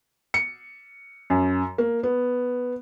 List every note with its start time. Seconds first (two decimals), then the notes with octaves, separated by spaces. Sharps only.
0.34 C#7
1.30 F#2
1.78 A#3
2.03 B3